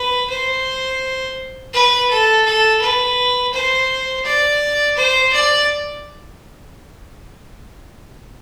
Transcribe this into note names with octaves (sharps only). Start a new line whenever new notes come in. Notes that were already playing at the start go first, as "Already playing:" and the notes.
Already playing: B4
C5
B4
A4
A4
B4
C5
D5
C5
D5